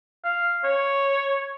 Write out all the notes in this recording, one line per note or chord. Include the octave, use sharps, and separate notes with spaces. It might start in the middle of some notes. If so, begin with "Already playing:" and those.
F5
C#5